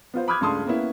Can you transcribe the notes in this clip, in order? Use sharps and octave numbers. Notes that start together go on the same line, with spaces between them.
B3 F4 C5
B5 D6 D#6 F6 F#6 G#6
C#2 G2 A3 A5 C6 D#6
A#3 B3 C#4 E4